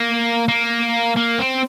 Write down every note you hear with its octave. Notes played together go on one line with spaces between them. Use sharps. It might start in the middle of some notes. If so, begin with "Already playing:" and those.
Already playing: A#3
A#3
A#3
C4